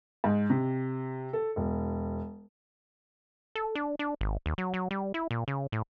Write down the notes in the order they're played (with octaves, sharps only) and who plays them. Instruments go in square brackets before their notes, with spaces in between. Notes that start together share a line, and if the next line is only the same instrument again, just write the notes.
[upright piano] G#2
C3
A4
E1
[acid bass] A4
D4
D4
G#1
D#2
F#3
F#3
G3
E4
A#2
C#3
A2